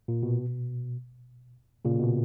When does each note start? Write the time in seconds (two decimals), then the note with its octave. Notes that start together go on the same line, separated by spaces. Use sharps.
0.08 A#2
0.23 B2
1.85 A#2 C#3
2.00 B2